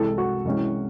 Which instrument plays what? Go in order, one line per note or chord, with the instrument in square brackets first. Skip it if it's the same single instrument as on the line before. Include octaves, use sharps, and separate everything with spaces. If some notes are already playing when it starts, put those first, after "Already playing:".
Already playing: [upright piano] C2 C3 E3 G#3 A4
F#4
C2 C3 E3 G#3 C#4